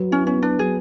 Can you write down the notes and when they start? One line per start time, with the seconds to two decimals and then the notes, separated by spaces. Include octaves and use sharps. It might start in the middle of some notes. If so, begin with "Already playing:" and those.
Already playing: F#3 B4
0.11 C#4 E4
0.26 B3 C#4
0.42 D4 B4
0.58 F#3 G#4